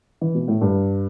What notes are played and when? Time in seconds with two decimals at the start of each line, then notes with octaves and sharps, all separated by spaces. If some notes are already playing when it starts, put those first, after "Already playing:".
0.21 E3
0.35 B2
0.48 A2
0.61 G2